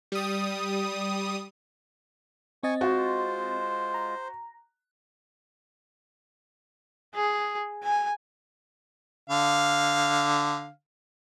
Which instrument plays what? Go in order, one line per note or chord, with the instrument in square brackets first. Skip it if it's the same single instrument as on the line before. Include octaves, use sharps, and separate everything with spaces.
[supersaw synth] G3 D#6
[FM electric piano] C4 D#5 A6 [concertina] G#5 C#6
[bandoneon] G#3 F4 [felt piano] F#4 [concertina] C5
[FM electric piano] A#5
[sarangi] G#4
G#5
[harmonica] D3 F5